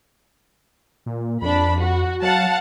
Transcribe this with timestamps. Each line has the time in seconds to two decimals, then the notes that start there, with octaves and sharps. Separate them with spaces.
1.06 A#2
1.42 F2 D4 B5
1.79 F#4
2.22 F#3 F5 F#5 A5